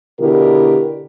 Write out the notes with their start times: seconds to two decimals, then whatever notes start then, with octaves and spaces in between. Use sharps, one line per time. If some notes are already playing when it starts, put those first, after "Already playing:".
0.21 B2 D3 E4 G4 A#4